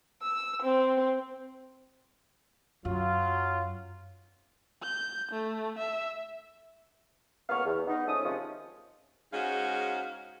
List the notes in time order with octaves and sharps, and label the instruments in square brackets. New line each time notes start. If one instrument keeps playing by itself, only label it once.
[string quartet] E6
C4
[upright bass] F#2 [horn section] F#3 F4
[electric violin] G6
A3
E5
[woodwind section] C#2 A#3 B3 C#6 F6
E2
B3 D#4
F3 G#3 A3 C#4 C#5 D#6
C3 D#3 F3 G#3 C4 C#4
[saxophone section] G#2 G#3 C#4 F#4 F5